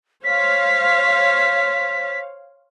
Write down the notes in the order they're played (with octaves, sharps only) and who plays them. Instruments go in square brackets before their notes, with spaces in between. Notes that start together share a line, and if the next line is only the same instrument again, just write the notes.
[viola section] C5 C#5 F5 [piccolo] B6